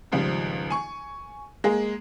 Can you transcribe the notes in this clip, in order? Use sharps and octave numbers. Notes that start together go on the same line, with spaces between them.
G#1 C#2 F3 G3
G#5 C#6
G#3 A#3 G#4